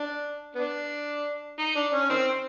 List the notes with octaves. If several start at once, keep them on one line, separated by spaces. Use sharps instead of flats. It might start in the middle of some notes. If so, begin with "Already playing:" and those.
Already playing: D4
B3 D4
D#4
D4
C#4
D#3 C4